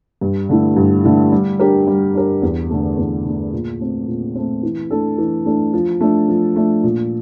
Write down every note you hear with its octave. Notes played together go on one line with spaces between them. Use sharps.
G2
D3 A3 E4
G2
D3 A3 E4
G3
D4 G4 A#4
G3
D4 G4 A#4
E2
D3 A3
E2
D3 A3
A#2
A3 C4
A#2
A3 C4
E3
A3 D4 A4
E3
A3 D4 A4
F3
A3 D4
F3
A3 D4
A#2